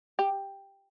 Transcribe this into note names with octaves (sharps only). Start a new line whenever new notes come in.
G4